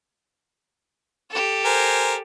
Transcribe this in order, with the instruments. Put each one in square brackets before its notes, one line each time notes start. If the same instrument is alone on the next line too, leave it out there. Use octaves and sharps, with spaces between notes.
[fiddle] G4 A4
[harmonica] A#4 C5 G#5